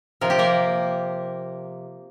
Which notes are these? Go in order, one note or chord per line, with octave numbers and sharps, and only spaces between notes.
C3 F3 A#4
G4
A#3 A#4